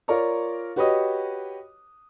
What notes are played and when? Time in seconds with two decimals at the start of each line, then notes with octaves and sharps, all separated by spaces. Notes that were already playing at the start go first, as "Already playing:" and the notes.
0.08 F4 A#4 C#5 D5 A#5 C#6
0.76 F#4 G4 B4 C#5 D#5 D#6